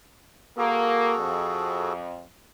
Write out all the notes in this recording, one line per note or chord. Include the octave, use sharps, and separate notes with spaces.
A#3 F#4 G#4 A4
F2